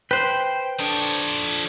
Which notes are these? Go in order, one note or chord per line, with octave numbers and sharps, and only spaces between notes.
B4 C5 G5
F3 D4 A4 C#5 D#6